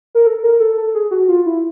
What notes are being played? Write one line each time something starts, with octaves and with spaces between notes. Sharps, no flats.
A#4
A4
A#4
A4
A4
G#4
F#4
F4
E4